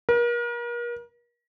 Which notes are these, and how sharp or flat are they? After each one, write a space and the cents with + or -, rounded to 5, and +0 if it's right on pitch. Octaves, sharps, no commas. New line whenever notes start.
A#4 +40